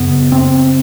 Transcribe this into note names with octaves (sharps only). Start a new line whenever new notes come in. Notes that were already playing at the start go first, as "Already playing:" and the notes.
Already playing: F#2 C#3 B3
C4